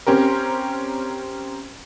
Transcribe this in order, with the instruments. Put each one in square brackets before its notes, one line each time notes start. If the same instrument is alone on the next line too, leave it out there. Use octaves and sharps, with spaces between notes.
[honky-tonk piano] C4 C#4 G4 A#4